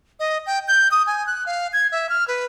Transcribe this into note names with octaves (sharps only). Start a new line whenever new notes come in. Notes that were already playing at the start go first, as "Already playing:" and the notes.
D#5
G5
G6
D#6
G#5
F#6
F5
G#6
E5
F6
B4